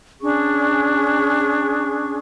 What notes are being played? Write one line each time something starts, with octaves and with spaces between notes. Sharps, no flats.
C#4 D4 G#4 C#6